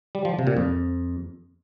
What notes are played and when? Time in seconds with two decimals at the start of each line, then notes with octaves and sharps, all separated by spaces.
0.15 G3
0.25 F3
0.39 C3
0.47 A#2
0.57 F2